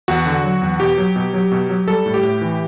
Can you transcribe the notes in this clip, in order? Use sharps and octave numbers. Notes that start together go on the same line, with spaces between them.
E2 F#4
D3
F#3
E2
B2 G4
F#3
B2
F#3
B2
F#3
G3 A4
A2
G4
A2
E3